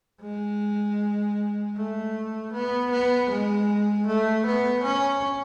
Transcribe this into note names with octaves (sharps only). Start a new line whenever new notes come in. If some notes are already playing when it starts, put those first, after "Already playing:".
G#3
A3
B3
B3
G#3
A3
B3
C#4